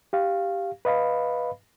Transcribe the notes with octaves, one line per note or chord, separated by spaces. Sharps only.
G4 F5
B4 D#5 F5 B5